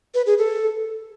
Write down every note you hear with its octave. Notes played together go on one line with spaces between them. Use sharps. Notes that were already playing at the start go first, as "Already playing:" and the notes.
B4
G#4
A4